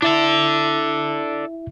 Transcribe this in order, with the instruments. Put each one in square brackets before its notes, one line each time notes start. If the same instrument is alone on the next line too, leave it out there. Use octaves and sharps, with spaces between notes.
[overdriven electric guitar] D4 A4 [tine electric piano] E4 E5